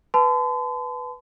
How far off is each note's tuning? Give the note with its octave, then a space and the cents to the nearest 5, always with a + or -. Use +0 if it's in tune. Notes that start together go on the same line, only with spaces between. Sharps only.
B4 +0 A5 -25 C6 -45